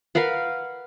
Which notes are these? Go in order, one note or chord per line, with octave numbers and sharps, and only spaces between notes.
A#4 B4 F5 F#5